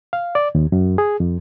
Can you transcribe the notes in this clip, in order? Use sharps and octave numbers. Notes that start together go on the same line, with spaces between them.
F5
D5
D#2
F#2
G#4
F2